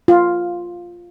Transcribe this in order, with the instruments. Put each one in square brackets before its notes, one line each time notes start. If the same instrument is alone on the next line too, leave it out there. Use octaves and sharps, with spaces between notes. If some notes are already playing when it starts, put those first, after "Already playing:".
[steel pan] F4